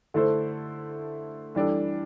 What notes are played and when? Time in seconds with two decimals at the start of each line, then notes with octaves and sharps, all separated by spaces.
0.14 D3 A3 E4 A4 C5
1.55 E3 G3 D4 A4